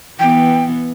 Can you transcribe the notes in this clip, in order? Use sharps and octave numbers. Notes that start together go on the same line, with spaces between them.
E3 B3 G5